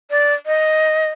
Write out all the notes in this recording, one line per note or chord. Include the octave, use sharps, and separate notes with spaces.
D5
D#5